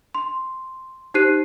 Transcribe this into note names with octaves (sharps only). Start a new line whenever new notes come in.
C6
D#4 G4 C5 F#6 C7 D#7